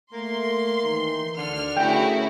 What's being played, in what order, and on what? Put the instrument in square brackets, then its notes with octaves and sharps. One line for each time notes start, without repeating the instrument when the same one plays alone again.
[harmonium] A3 [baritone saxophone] A#3 [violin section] C6
[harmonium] D#3 E3 D#4
[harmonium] D2 [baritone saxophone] D3 [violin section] F6
[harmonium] A3 G#4 A#4 [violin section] C#4 E4 F#4 [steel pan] G5